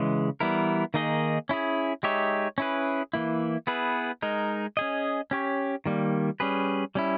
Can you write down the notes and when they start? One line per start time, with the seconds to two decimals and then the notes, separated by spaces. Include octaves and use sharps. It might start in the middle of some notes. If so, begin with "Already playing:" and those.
Already playing: C#3 E3 G#3
0.40 E3 G3 B3 E4 A#4
0.94 D#3 A#3 D#4 G#4 D#5
1.49 C#4 E4 G#4
2.03 G#3 D#4 G4 C#5 E5
2.58 C#4 E4 G#4 B4
3.13 E3 A#3 E4
3.67 B3 E4 G#4 B4
4.22 G#3 D#4 A#4
4.77 C#4 G#4 D#5
5.31 C#4 G4 C#5
5.86 D#3 G3 A#3
6.40 G3 C#4 G#4 B4
6.95 G3 C#4 E4